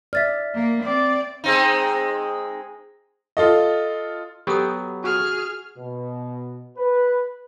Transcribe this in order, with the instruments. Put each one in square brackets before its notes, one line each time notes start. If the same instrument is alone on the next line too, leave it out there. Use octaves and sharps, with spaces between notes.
[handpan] D5 E5 [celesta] F6 A6 B6
[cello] A#3
[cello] C4 [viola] D5
[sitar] G#3 C4 D#4
[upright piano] F4 A4 D#5
[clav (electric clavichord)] F#3 B3 G5 [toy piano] G4 A4 D#6
[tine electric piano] F#4 [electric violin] G#4 F6
[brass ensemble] B2
B4